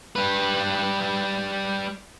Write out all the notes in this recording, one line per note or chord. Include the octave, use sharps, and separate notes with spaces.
G3 B4